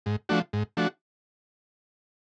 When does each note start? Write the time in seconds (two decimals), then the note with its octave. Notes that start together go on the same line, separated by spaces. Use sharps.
0.06 G#2
0.29 F3 A3 D4 F#4
0.53 G#2
0.77 F3 A3 D4 F#4